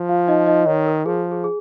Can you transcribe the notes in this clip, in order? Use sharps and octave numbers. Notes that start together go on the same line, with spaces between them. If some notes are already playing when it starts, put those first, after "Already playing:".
Already playing: F3
F4 F5
D#4 D#5
D#4 D#5
D#3 C#5
A#4
F3 G#4
G#4
G#4